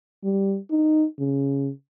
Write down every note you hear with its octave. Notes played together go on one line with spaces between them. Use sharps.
G3
D#4
C#3